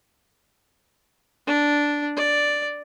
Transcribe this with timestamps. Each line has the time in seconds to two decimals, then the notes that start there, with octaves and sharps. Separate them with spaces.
1.47 D4
2.16 D5